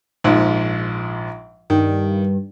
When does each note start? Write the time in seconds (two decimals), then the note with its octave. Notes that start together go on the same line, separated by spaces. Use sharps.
0.24 A#1 G#2 F3
1.70 G2 D#3